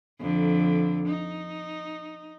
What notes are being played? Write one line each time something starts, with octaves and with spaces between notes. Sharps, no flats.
F2 D3
D#4